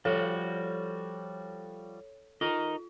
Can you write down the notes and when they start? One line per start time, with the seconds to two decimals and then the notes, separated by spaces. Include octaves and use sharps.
0.05 F3 G3 F#4 A4 C#5
2.41 D#4 F4 A#4 D#5